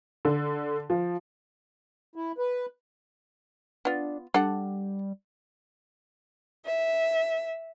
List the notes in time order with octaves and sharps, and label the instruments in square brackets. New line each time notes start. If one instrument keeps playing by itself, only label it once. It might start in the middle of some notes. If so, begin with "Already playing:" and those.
[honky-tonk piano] D3
F3
[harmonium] E4
B4
[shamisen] B3 F4 [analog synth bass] D4
[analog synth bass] G3 [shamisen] D4 A4 F#5
[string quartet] E5